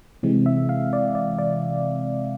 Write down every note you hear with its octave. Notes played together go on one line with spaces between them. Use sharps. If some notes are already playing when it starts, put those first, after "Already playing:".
C3 E3 G#3 C4
E5
F5
D5
D5
D5